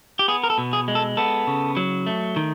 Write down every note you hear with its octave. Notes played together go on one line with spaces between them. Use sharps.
G4
B3 G#4
A#4
A4
B2
G#4
G#3
A4
B3 A4
C#3
F#3
A3
D#3